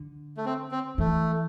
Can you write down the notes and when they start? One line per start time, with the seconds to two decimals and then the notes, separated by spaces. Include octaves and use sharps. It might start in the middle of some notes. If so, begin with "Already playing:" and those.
Already playing: D3
0.37 A3
0.46 C4
0.71 C4
0.98 E3 A3